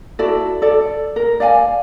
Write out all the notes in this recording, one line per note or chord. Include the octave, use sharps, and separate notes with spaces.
E4 F#4 A4 D5
A4 D5
A#4
D5 F5 G5 G#5